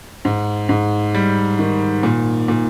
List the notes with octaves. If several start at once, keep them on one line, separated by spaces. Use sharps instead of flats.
G#2
G#2
G3
D#3
A#2
A#2